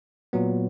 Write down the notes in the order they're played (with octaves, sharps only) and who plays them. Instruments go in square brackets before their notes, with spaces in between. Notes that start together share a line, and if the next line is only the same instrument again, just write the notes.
[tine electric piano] A#2 F#3 B3